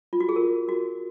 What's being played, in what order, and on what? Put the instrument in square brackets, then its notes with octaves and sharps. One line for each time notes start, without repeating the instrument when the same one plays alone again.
[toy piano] F4
F#4
G#4
A#4
F#4